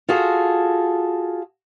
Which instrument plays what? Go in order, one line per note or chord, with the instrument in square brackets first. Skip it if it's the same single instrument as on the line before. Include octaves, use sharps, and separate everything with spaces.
[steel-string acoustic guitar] F4 F#4 G#4 A4